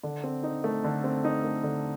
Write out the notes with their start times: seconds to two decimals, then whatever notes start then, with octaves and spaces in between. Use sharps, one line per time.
0.03 D3
0.24 C4
0.43 D#4
0.64 A3
0.84 D3
1.04 C4
1.24 D#4
1.44 A3
1.64 D3